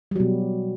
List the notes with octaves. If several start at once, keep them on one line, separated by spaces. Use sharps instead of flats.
B2 F#3 G3